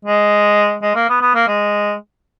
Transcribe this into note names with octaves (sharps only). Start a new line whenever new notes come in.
G#3
G#3
A#3
B3
B3
A#3
G#3